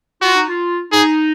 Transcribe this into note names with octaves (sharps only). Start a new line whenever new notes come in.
F4 F#4
D#4
F4
D#4 G#4